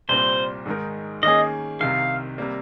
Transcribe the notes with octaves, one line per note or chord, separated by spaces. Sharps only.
C2 A#2 G3 C4 C5
G#2 D#3 G#3 D#4 A#4
D#3 A#3 C#4 G#4 D#5
C2 C3 D#3 F5
C3 G3 A#3